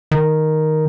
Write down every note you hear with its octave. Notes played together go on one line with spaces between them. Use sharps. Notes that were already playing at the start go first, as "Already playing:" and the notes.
D#3